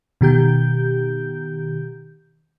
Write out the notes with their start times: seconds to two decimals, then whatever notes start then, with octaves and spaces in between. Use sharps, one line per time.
0.21 B2 D#3 G4 G6